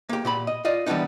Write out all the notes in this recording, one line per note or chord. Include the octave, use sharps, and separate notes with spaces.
A#3 G4
A#2 G4 B5
D#5
F4 D5 D#5
E3 G3 A#3 B3 D4 D#4